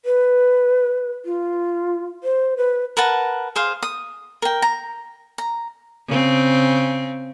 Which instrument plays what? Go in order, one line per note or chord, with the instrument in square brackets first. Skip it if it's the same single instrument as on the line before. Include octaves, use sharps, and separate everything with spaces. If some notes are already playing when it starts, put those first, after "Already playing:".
[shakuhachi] B4
F4
C5
B4
[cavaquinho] A#4 B4 F#5 A5
G#4 C5 F5
D#6
A#4 G5
A#5
A#5
[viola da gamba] C#3 C4